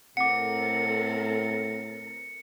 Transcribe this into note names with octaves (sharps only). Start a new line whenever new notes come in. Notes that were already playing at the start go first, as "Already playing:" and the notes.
A2 C4 A4 A#4 F#5 D6 C#7